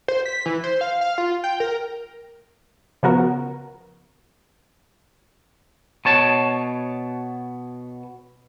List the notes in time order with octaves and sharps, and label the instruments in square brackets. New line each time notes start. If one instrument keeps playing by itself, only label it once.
[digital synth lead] C5
B6
E3
C5
F5
F5
F4
G5
A#4
[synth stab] C#3 F3 B3 F#4 A#4
[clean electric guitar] B2 C#5 A5